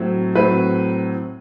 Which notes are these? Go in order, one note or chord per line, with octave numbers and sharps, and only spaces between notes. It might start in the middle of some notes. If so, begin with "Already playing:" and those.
Already playing: A2 F#3 C4
A2 F#3 C4 B4